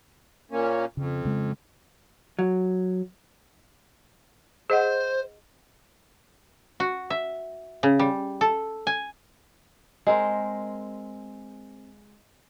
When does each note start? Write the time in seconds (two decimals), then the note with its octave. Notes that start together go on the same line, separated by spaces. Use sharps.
0.51 A#2 A#3 C#4
0.97 F2 C#3
1.25 C#3 G#3
2.39 F#3
4.70 G#4 C5 D#5 F#5
6.80 F#4
7.10 E5
7.83 C#3
7.99 G3
8.41 A4
8.87 G#5
10.07 G#3 C4 A#4